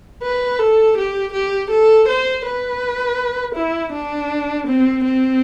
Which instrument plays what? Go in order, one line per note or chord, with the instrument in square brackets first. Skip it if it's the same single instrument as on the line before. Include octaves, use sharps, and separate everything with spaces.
[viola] B4
A4
G4
G4
A4
C5
B4
E4
D4
C4
C4